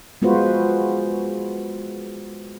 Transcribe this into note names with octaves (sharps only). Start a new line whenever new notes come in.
G#3 B3 F4 F#4 B4 C5